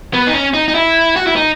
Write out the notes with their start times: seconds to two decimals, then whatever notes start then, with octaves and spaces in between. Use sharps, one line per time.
0.14 B3
0.27 D#4
0.33 C#4
0.54 D#4
0.68 D#4
0.75 E4
1.16 F#4
1.27 E4
1.36 D#4